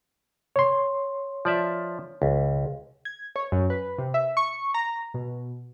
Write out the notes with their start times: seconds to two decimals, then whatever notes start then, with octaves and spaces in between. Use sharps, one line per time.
0.56 C#5 C6
1.45 F3 D5 E5
2.22 C#2
3.05 G#6
3.36 C#5
3.52 F#2
3.70 B4
3.98 C3
4.14 E5
4.37 C#6
4.74 A#5
5.14 B2